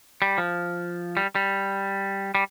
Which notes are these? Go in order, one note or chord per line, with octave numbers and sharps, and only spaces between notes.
G3
F3
G3
G3
G3